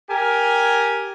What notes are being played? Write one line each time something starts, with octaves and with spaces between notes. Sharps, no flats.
G4 A#4 G#5